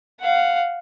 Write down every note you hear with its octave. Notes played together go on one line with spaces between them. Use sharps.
F5 F#5